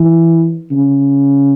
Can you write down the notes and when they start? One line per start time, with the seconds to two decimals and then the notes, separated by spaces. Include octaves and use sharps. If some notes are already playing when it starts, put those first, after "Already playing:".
Already playing: E3
0.71 C#3